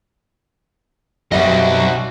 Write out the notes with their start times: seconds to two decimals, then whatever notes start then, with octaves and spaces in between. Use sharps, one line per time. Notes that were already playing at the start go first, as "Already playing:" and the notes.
1.32 B1 F#2 G3 C4 F#4 D#5 E5